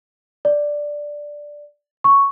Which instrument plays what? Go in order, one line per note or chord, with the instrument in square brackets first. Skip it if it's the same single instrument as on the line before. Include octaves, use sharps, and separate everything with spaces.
[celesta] D5
C#6